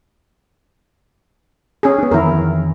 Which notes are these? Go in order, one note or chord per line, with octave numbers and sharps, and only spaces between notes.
C#4 G#4
B3 D4
F2 D#3 E3 E4 A#4